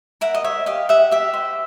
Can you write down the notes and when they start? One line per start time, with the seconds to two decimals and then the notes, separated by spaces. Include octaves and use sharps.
0.21 A#4 E5 F#5
0.34 D#5
0.44 C#5 E5
0.66 G4 D#5 F5
0.89 G4 E5 F#5
1.11 G4 E5
1.33 C5